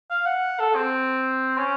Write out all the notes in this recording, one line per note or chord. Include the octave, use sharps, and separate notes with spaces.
F5
F#5
A4
C4
C#4